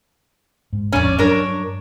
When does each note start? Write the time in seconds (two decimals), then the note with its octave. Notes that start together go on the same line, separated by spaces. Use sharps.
0.73 G#2
0.92 D1 F2 C#4 D5
1.18 G2 F#3 D4 A#4 C#5